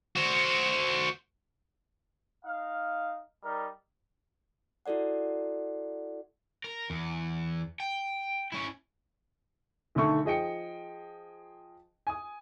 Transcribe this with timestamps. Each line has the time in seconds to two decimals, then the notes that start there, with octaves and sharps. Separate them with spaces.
0.16 F#4 C5
2.45 D#4 F5
3.44 G3 D#4 A#4
4.86 E4 F#4 A4 D5 F#5
6.64 A#4
6.90 E2
7.80 G5
8.52 C#4 E4
9.95 B1 D3 D#3 A3 C#6
10.25 F3 G#4 D#5 G5 C#7
12.07 G#5 D#6